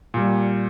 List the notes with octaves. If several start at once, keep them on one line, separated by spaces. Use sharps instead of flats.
A#2 G3